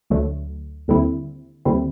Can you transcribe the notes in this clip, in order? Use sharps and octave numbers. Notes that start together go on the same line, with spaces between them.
D2 D3 F#3 A3
D#2 D3 G3 C4 E4
D#2 D3 G3 C4 E4